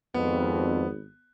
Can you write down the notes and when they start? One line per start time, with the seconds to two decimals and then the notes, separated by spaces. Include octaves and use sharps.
0.14 G#1 F2 B3